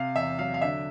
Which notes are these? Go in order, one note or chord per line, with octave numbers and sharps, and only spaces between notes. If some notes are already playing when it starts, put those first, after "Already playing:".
Already playing: C3 F5
E2 E5
F#3 F5
F5
D3 E5